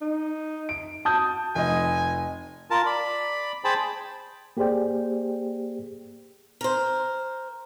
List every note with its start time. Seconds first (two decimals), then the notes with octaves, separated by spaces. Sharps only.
0.02 D#4
0.69 D7
1.05 F#4 A5 D#6 G6
1.55 F1 D#5 G#5
2.71 F4 A#4 A5
2.86 D5 B5
3.64 G#4 C5 G5 A5 B5
4.57 A#3 G4 G#4 C5 D5 G5
6.61 A#4 C5